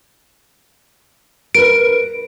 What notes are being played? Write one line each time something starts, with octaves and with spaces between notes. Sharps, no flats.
A#4 B4 D7